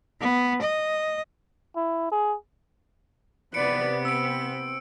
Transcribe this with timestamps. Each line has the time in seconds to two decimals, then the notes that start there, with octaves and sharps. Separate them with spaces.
0.21 B3
0.62 D#5
1.76 E4
2.11 G#4
3.54 C3 B3 B4 D5 C#7 D7
4.05 C4 E6 D7